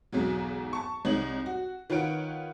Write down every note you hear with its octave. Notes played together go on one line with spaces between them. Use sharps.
B1 E2 G#2 F#3
A5 C#6
C2 G#3 D#4 C#5 F#7
F#4
D#3 F4 B4 C#5 F#5 D7